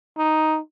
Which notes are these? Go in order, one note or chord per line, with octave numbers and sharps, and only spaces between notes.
D#4